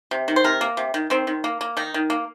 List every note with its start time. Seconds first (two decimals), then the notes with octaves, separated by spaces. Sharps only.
0.11 C3
0.28 D#3
0.36 C5
0.44 C3 A#4
0.61 A#3
0.77 C3
0.94 D#3
1.10 D#3 C4
1.27 D#3
1.44 A#3
1.61 A#3
1.77 D#3 D#4
1.94 D#3
2.10 A#3